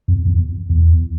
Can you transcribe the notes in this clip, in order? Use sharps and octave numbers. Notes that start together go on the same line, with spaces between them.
F2
E2
E2